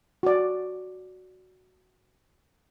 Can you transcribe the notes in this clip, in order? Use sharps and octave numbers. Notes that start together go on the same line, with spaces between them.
F#4 D5